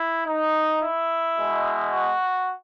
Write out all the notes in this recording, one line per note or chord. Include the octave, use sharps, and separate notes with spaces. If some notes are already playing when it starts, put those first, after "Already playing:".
Already playing: E4
D#4
E4
B2 G#3
F#4